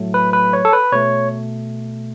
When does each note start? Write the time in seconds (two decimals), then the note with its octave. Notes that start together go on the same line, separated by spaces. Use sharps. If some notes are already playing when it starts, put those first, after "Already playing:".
Already playing: A2 F#3 A3
0.14 B4
0.33 B4
0.53 C#5
0.65 A4
0.73 B4
0.92 B2 A3 C#5